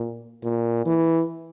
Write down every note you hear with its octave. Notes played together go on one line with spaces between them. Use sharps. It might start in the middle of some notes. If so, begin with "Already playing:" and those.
Already playing: A#2
A#2
E3